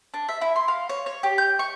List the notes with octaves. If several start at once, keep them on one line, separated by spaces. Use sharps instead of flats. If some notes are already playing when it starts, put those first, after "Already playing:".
D4
E5
E4
C6
F5
C#5
C#5
G4
G6
C#6